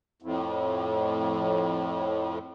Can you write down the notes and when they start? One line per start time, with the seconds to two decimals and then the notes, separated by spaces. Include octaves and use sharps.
0.22 F2 A2